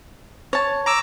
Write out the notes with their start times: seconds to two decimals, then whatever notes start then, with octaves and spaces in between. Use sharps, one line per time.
0.53 C#5 A5
0.86 A#5 D6 E6